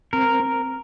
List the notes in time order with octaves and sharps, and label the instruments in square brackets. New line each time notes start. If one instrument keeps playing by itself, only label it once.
[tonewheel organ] C4 [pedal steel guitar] A#4